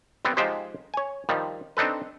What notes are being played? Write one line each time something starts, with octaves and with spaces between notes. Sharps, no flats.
G3 B3 C4
F3 G#3 D#4 G4 C5
C#5 G#5
D#3 F3 G3
C4 D4 D#4 A4 B4